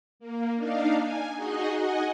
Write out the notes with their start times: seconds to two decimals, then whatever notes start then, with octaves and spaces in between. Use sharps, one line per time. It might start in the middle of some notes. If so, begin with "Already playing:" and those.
0.19 A#3
0.56 D4 D#4 F5
1.02 G#5
1.36 D#4 F#4 G#4 D#5
1.75 D#5 F#5 G#5